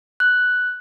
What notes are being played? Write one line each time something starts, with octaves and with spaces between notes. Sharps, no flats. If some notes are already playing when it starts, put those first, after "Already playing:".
F#6